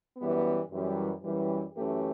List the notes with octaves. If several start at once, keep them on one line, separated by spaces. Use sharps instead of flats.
F#2 E3 G3 B3
F#2 E3 G3
F#2 E3 G3
F#2 E3 A3 C#4 G4